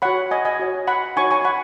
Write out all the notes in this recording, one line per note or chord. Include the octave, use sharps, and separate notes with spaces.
F#4 C#5 F#5 B5
D#5 G#5
D#5 G#5
F#4 C#5
F#5 B5
D#4 F#4 C#5 G#5 C#6
G#5 C#6
F#5 B5